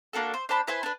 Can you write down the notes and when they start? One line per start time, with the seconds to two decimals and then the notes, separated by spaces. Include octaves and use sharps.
0.13 A#3 D4 F#4 A4
0.34 C5
0.49 D4 C5 A5 B5
0.67 E4 B4 C5 G#5
0.83 D4 B4